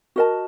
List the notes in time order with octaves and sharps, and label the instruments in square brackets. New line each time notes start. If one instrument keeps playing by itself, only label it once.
[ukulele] F#4 A#4 D#5 A5